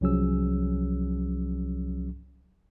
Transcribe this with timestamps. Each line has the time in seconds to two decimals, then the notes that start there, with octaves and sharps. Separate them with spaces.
0.01 C2 F3 F#3 C#4 G#4 E6